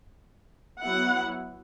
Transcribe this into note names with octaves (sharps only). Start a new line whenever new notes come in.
F#3 B3 E4 F#5